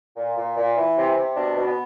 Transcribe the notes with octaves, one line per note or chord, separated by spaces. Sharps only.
A#2
A#2
A#2
E3
C3
C3
B2 D4
B2
B3